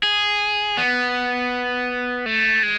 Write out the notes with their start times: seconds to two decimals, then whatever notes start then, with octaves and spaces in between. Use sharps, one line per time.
0.03 G#4
0.77 B3
2.26 A3
2.63 G#3